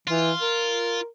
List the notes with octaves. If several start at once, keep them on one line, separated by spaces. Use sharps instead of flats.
E3 F4
A#4